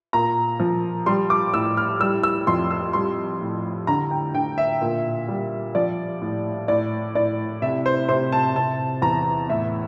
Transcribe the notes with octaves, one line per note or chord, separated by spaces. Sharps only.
A#2 A#5
F3
G3 C6
D6
A2 E6
F6
G3 E6
E6
F2 C6
E6
G3 C6
A2
D3 A#5
G5
D3 G5
E5
A#2
G3
F3 D5
A2
A2 D5
A2 D5
C3 E5
C5
C3 C5
A5
C3 A5
E2 A#5
A2 E5